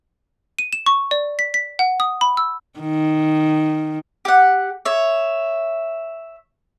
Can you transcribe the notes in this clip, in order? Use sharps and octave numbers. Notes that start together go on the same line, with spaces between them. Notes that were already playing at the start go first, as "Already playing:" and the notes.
D#7
E7
C#6
D5
B6
B6
F#5
D#6
B5
E6
D#3
G4 F#5
C#5 E5